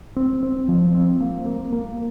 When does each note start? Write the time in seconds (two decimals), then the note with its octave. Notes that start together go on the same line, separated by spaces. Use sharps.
0.16 C4
0.43 C4
0.68 F3
0.94 C4
1.21 A#3
1.46 A#3
1.73 A#3